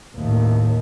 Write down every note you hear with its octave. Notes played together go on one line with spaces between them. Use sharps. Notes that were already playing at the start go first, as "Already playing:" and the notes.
D#2 A2